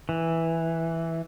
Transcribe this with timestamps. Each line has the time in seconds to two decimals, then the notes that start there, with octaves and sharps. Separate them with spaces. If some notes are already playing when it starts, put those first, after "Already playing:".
0.09 E3